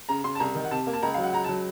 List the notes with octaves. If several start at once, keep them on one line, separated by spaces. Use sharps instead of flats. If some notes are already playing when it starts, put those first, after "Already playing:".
C#3 A#5
C#3 C6
A5
C2 A#5
D#3
F#5
C3 A5
A#3
A5
C#2 A#5
F#3 F5
F#5
C#2 A#5
F#3 A5